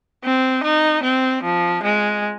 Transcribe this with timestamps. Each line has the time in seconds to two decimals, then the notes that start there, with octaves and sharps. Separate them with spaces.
0.25 C4
0.64 D#4
1.04 C4
1.44 F3
1.84 G#3